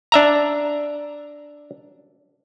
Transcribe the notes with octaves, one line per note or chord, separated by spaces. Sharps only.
D4 E5 A#5